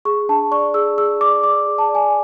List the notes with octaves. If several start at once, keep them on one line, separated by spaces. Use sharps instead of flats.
G#4 C#6
D4 A5
D5 C#6
G#4 E6
G#4 E6
D5 D6
D5 D6
G#4
A5
D5
G#5